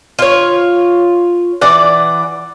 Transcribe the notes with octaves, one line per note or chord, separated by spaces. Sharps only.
F4 C#5
E3 D5 F#5